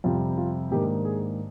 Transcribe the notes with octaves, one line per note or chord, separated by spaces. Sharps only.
F2 C3 G3 F4
F4
G#2 D#3 A#3 D4 G4
G#4